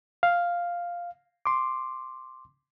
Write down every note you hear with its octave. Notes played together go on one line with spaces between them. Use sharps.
F5
C6 D6